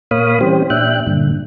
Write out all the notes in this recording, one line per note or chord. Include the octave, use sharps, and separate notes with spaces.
A#2 A#3 C#5 F5 B5 D#6
E3 G3 C4 C#4 G4 C5
A#2 D4 E5 G5 F#6
G2 A#2 D3